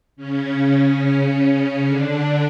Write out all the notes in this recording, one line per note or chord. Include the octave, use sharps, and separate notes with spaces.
C#3 C#4
D3 D4